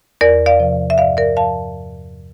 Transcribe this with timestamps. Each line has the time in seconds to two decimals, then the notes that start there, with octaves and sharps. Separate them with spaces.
0.21 E2 A#4 D5
0.46 D5 F5
0.59 C3 F3
0.90 E5
0.98 G2 D5 F5
1.17 A#4 D5
1.37 F3 F5 A5